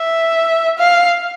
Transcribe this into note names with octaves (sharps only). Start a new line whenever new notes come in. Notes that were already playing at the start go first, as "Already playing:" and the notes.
Already playing: E5
F5